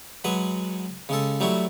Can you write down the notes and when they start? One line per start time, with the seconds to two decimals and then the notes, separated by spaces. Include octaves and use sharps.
0.24 F#3 G#3 B4 F#5
1.09 C#3 G#3 A4
1.40 F#3 G3 A3 E4 F#4